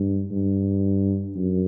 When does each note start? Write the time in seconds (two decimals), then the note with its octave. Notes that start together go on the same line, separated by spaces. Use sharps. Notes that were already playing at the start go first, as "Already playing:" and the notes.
Already playing: G2
0.31 G2
1.36 F#2